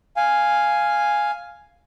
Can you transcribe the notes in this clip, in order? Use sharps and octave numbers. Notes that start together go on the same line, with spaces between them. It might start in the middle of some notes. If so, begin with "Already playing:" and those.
F5 G#5